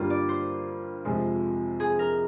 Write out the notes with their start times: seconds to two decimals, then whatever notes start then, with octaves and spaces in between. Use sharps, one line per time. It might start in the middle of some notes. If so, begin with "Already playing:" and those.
Already playing: G2 D3 G3 A#3 F4
0.10 D5
0.29 C5
1.05 F2 C3 F3 G#3
1.80 G#4
1.99 A#4